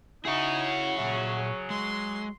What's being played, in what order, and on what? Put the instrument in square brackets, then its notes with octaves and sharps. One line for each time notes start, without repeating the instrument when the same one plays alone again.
[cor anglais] D#4 [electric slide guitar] E4 E5 [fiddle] F#4 [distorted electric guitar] G#4 C#5
[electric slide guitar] A#2 E5 [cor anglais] F#3
[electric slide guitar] G#3 [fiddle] C6